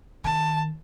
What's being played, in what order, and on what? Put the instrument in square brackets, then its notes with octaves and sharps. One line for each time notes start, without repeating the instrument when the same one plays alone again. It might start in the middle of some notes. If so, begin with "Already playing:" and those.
[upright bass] D#3 [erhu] A5